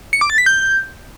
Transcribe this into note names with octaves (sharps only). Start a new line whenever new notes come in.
C#7
D6
A6
B6
G6